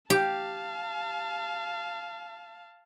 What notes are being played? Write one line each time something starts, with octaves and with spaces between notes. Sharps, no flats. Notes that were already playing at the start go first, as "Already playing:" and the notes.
G4 F5 A5